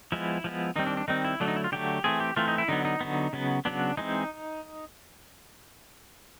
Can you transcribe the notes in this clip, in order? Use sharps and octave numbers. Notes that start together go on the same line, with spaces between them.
F3 G#3 B3 E4
F3 G#3 B3
D#3 G3 C4 D#4
D4
D4
D#3 G3 C4 D#4
E4
D3 F#3 A3 D4
D#4
E4
F4
D3 F#3 A3 G4
E3 A3 C4 G#4
G4
E3 A3 C4 F4
D#4
E4
D3 F#3 B3 D#4
D#4
D3 F#3 B3
C#3 F#3 B3
C#3 F#3 B3 D4
E3 G#3 C4 D#4